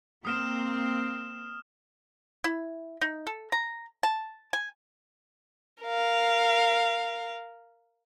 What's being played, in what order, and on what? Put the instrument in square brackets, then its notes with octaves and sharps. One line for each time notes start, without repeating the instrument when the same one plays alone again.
[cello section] A#3 C4 [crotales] D#6 F6 E7
[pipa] E4
D#4
A4
A#5
A5
G#5
[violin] A#4 F5